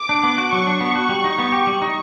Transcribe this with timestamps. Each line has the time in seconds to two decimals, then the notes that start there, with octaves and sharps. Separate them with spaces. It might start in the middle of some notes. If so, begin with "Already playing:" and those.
Already playing: D6
0.09 D4
0.23 B3
0.38 F#4
0.52 F#3 C#6
0.67 D4
0.81 B3
0.95 F#4
1.09 G3
1.24 D#4
1.38 B3
1.52 G4
1.67 G3 C#6
1.82 D#4